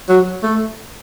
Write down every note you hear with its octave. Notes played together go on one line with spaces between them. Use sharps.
F#3
A3